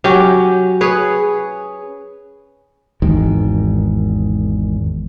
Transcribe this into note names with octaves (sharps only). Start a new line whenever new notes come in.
F#3 C#4 G4
G#4 B4 C#5
G#1 E2 G#2 D#3